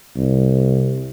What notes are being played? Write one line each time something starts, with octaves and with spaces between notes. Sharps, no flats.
C2